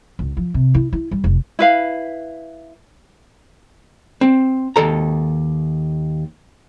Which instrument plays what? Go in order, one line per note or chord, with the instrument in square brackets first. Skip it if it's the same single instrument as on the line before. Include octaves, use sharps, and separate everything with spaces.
[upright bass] C#2
F3
C3
E4
E4
G3
F1
[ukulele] E4 B4 F5
[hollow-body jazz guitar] C4
D#2 A4 A#5